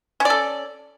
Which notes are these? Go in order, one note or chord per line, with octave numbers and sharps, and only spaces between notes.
C#4 A4 D5